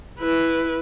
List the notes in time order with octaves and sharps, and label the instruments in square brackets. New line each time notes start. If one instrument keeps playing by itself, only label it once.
[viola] E4 B4